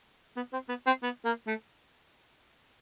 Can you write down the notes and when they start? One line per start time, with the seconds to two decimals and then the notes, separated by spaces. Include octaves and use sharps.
0.36 B3
0.53 C4
0.69 B3
0.86 C4
1.03 B3
1.25 A#3
1.47 A3